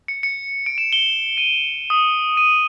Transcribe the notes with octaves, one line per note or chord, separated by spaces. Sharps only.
C#7
C#7
D7
E7
G7
D#7
D#6
D#7